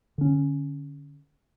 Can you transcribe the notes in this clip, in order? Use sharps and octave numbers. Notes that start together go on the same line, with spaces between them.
D3 C#4